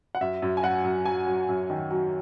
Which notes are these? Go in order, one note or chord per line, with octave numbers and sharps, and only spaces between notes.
F#5
F#2 E5
F#2
G#5
F#3 F#5
F#2
F#3 G#5
F#3
F#2
D#3
F#3